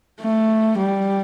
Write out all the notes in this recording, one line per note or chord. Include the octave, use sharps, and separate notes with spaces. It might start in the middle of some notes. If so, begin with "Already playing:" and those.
A3
G3